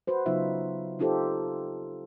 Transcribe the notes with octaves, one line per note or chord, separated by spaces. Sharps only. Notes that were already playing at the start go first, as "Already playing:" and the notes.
F#4 B4 C5
C#3 F#3 B3 D#4 F4 E5
C4 D#4 F4 G4 A4 C5